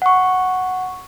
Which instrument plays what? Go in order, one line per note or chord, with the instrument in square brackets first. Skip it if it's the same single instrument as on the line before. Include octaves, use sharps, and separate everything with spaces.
[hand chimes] F#5 C#6